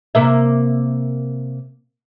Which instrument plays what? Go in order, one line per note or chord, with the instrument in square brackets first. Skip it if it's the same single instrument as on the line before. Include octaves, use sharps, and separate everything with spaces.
[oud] C3 A#3 E5